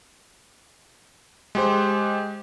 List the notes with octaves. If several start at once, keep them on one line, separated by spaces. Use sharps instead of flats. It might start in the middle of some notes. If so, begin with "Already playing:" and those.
G#3 G4 C5